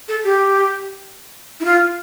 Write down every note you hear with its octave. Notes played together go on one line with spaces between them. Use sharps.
A4
G4
E4
F4